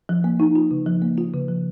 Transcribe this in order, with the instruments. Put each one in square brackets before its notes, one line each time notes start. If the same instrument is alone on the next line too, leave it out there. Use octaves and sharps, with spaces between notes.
[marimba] F3
A#3
D#4
F4
C#3
F3
A#3
F4
C#3
F3